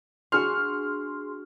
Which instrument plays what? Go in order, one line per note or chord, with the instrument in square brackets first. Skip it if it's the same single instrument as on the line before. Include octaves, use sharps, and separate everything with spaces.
[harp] D4 F#4 F#5 [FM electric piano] G#4 C6 [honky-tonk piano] F6